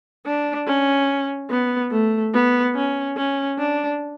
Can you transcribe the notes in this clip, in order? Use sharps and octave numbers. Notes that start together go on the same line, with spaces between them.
D4
C#4
B3
A3
B3
C#4
C#4
D4